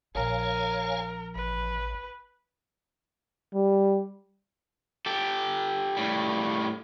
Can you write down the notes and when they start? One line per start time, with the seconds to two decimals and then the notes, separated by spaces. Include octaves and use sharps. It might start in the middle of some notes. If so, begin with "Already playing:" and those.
0.15 A#1 A#4 C#5 F5 G#5
1.35 A1 B4
3.54 G3
5.06 G4 A4
5.97 A2 G3